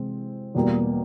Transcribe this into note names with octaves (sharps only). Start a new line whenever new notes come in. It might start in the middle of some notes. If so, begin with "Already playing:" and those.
Already playing: C3 E3 G#3 C4
E2 B2 G3 A#3